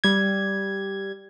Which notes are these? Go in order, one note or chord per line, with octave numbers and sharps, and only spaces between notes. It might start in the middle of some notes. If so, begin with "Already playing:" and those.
G3 G#6